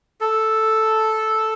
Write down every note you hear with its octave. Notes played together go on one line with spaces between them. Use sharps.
A4